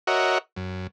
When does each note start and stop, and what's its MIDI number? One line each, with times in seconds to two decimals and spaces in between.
0.07 0.38 66
0.07 0.38 70
0.07 0.38 73
0.07 0.38 75
0.07 0.38 76
0.07 0.38 78
0.56 0.87 42